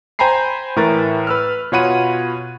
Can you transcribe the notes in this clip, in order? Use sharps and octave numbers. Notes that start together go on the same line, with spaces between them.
C5 G5 G#5 A#5 B5 C7
A2 E3 A#4 B4 C#6 A6
B4 E6 F6
B2 F4 C#5 F#5 B5 D#7